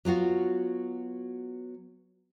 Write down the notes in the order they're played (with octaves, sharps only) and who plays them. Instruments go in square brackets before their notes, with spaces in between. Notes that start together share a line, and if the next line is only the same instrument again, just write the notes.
[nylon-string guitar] F#3 B3 F4 F#4